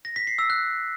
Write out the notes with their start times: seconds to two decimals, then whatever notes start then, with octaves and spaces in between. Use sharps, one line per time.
0.05 A#6
0.16 B6
0.27 C7
0.39 E6
0.50 F#6